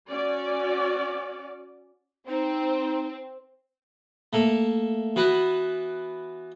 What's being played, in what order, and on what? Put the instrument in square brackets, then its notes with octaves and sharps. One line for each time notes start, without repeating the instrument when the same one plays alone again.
[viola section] C#4 F#4 D5
[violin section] C4 [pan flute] D#4
[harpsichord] A3 A#3 A4
E3 B3 F#4 B4